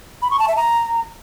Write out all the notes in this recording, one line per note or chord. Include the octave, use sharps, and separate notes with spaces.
B5
C#6
A5
E5
A#5